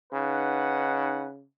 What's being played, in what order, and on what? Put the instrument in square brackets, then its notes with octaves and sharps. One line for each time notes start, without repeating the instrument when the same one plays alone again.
[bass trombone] C#3 [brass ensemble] D#4 B4 F#5